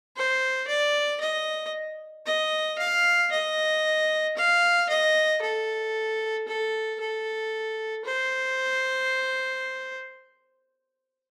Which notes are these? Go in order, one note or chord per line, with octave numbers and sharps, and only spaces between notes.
C5
D5
D#5
D#5
F5
D#5
F5
D#5
A4
A4
A4
C5